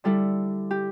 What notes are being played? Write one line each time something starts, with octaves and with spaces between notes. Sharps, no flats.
D3 G3 E4 A4
G4